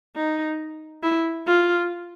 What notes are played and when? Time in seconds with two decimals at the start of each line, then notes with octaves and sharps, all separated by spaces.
0.16 D#4
1.03 E4
1.47 F4